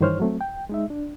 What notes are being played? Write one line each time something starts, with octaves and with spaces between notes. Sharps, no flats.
G2 D#3 E3 C5 C#5 F6
F#3 A3 C4
G5
G#3 D#4 E5
D4